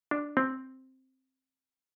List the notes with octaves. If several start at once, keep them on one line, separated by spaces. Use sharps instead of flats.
D4
C4